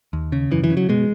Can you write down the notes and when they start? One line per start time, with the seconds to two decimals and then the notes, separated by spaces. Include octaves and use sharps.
0.13 D#2
0.32 C#3
0.51 F#2 E3
0.64 E3
0.70 C#3
0.77 F#3
0.89 B2 G#3